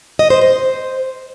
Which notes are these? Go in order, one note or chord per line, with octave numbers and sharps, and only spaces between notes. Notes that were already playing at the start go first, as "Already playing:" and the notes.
D#5
C5
C5